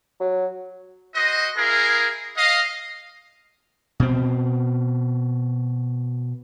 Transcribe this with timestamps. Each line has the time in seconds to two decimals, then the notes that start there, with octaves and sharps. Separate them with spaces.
0.20 F#3
1.15 F#4 C5 D#5
1.56 E4 G#4 A#4 F5
2.37 D#5 F5
4.00 B2 C4